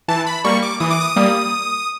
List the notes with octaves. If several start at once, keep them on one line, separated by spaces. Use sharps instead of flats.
E3 A5
B5
G3 A#3 C#6
D6
E3 D#6
D6
D#6
G3 A#3